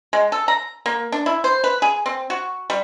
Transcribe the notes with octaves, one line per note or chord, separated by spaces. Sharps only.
G#3
A4
A#5
A#3
D4
E4
C5
B4
G#4
C4
F#4
G3